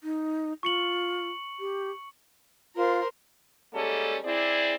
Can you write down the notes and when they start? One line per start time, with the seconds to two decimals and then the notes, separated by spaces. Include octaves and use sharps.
0.03 D#4
0.63 F4 C#6 C#7 F#7
1.60 G4
2.76 F4 A#4 C5
3.73 G3 G#3 A#3 C#4 A4
4.24 C4 E4 G#4 D5